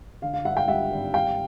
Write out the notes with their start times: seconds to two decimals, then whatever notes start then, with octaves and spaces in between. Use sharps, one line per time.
0.22 D3 F5
0.34 F5
0.45 G2 E5 F#5
0.56 F5 G5
0.68 G3 E5 F#5
0.91 G#1
1.14 G3 F5 G5